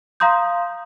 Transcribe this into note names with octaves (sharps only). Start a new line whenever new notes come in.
F5 A#5 C6 D#6 G6